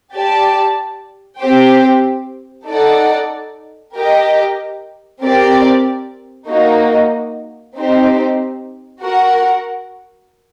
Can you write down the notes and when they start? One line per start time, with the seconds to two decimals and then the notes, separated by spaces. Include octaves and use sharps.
0.13 G4 D5 A5
1.40 C4 G4 C5 G5
2.67 D#4 A4 D5 F#5
3.95 G4 A#4 D#5 G5
5.22 C4 G4 A#4 D5
6.49 A#3 D#4 F#4
7.77 C4 D#4 G4 C5
9.03 F#4 A#4 F#5